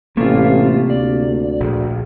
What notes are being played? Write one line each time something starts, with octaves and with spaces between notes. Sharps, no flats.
A1 C3 A3 A#3 F4
D2 D5
A#1